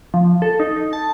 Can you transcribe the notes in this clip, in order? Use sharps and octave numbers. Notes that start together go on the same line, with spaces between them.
F3
A4
D#4
D#4
A5